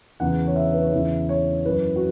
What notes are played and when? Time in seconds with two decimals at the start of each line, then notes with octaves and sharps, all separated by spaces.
0.20 E2 C#3 E3 F#5
0.47 C#5
0.56 E5
0.74 B4
0.83 C#5
0.92 E2 C#3 E3 E5
1.29 C#5
1.65 F#2 E3 B4
1.96 F#4